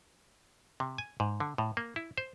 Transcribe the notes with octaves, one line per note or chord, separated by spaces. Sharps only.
C3
G#5
G#2
D3
A2
A#3
E4
C5